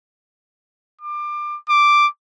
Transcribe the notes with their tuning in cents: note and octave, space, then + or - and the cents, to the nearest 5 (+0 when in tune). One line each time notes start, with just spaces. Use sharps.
D6 +25
D6 +0